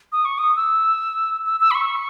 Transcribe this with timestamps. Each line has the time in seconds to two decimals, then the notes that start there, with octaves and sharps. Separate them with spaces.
0.12 D#6
0.25 C#6
0.38 D#6
0.56 E6
1.46 E6
1.60 E6
1.71 B5
1.75 C#6